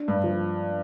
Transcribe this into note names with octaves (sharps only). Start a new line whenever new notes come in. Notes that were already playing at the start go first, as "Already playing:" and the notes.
Already playing: D4
G2
F3